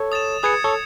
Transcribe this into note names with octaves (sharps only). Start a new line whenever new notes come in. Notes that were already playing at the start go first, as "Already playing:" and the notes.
Already playing: A4 C#5
D#6 A6 E7
G#4 B4 D#6 G#6 C#7
A4 C#5